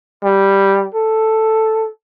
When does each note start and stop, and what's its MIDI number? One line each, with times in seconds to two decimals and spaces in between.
0.24 0.86 55
0.94 1.88 69